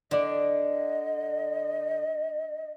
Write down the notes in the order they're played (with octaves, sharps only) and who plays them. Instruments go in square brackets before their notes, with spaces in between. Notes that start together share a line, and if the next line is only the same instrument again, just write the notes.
[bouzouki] D3 [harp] D4 D5 [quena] D#5